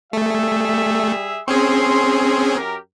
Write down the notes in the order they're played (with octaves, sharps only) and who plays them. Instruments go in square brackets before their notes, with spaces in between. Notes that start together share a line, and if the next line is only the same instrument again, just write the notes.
[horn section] G3 G#4 E5 [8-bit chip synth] A3
[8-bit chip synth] C4 C#4 G#4 [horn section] C6
[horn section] F#2 G4 A#4